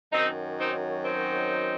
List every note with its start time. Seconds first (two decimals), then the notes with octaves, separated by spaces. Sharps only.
0.12 F#2 D#3 F#3 C4 D#4
0.58 C4 D#4
1.04 C4 D#4